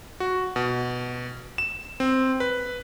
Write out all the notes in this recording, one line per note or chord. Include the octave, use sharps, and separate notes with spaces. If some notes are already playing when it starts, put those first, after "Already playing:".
F#4
B2
E7
C4
B4